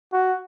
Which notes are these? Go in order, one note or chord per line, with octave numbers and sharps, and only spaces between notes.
F#4